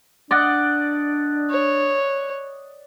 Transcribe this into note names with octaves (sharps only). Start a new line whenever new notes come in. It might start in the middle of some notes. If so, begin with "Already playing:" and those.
D4 D5 D#5 F#5
C#5